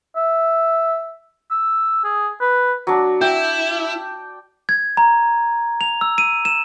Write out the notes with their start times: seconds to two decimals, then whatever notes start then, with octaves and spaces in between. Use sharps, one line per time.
0.16 E5
1.51 E6
2.04 G#4
2.41 B4
2.87 F#3 D4
3.21 E4 G5
4.69 G#6
4.97 A#5
5.81 F7
6.01 E6
6.18 D#7
6.45 E7